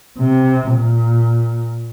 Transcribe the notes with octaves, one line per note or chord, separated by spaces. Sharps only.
C3
A#2